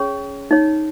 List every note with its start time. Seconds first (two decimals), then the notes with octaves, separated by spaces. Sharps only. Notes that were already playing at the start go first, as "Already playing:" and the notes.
Already playing: C#4 G#4 C#5
0.51 D#4 C#5